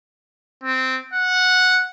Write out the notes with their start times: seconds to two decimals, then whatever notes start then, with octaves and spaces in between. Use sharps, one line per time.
0.64 C4
1.14 F#5